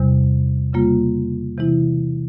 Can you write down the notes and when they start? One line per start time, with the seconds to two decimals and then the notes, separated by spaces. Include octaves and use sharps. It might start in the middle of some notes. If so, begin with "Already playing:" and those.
Already playing: E2 C3 G3
0.73 C#3 G3 A#3 F4
1.58 C3 E3 G#3 E4